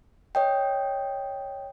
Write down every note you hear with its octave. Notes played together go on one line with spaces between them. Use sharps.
C#5 D#5 G5